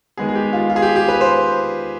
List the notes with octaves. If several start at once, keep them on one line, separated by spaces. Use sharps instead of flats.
D#3 G#3 B3 G#4
G#4
G4
F4
F4
G#4
G4
G4
B4
C5